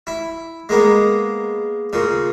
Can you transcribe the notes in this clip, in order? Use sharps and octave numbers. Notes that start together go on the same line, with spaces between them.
E4
G#3 A#3 B3
A#2 C#3